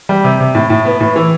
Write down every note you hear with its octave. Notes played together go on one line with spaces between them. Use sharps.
G3
C3
C3
A2
A2
B3
A2
E3